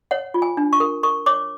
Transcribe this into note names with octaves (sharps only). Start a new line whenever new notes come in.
C#5 F#5
F4
G#5
D4
C#6
A#4
A#4 C#6
C#5 D6